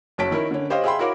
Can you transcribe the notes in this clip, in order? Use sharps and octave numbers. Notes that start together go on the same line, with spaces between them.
F#1 F#3 C#5 A5 B6 D7
D#3 E4 A#4 C#5
D3 C#4
G4 C5 C#5 D#5 F5
G#4 E5 F5 G5 B5 C6
E4 F#4 A#4 C#5 F5 D6